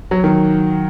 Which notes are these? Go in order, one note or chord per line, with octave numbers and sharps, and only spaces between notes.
F#3
D#3